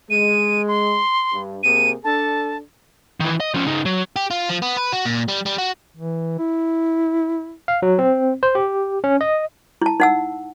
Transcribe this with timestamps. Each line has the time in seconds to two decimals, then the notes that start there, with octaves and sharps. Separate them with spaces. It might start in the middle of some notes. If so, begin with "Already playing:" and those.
0.10 G#3 D#7
0.68 C6
1.32 G2
1.63 C3 A#3 G#4 D#7
2.04 D4 A4 A5
3.20 D#3 E3
3.40 D#5
3.54 F3 C#4
3.66 C#3 D#4
3.85 F#3
4.16 G4
4.30 F4
4.49 F3
4.62 B3
4.77 B4
4.92 F#4
5.06 A#2
5.28 G3
5.46 G3
5.58 F#4
5.97 E3
6.39 E4
7.68 F5
7.82 F#3
7.99 C4
8.43 C5
8.55 G4
9.04 C#4
9.21 D#5
9.82 E4 A5
10.00 D#4 F#5 E6